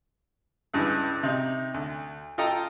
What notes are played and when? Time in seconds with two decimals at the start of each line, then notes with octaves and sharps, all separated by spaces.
0.74 C#2 G2 E3
1.23 C3 D#4
1.74 D2
2.38 F4 A4 D#5 G5 A#5